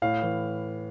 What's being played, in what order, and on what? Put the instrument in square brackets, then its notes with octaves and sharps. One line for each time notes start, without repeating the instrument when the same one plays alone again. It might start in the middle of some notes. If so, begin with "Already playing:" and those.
[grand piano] A2 F5
E3